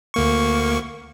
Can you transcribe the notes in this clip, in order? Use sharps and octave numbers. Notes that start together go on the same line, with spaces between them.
D2 A#3 C#6